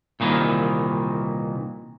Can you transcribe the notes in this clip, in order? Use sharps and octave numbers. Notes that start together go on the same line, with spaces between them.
C2 A#2 D#3 E3